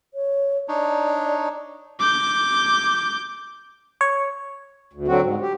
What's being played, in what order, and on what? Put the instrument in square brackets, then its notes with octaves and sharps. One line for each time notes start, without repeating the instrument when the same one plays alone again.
[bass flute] C#5
[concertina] D4 D#4 C#5 [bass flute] D5
[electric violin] D6 G6
[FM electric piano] C#5
[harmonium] D2
D3 F#3 C4 F#4
G#2
G4